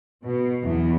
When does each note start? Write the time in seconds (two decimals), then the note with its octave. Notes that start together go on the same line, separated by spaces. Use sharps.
0.24 B2
0.63 E2